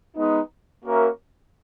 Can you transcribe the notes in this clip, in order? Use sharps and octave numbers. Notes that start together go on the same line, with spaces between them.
G#3 B3 D#4
A#3 C#4 F#4 A#4 E5